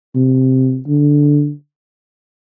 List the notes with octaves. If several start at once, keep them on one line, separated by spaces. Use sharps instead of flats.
C3
D3